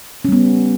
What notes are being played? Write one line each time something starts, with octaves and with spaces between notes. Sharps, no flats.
G3 B3 C#4